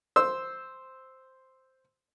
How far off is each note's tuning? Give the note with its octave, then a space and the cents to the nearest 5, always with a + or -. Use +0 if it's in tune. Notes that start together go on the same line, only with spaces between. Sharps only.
C5 +0 E6 -5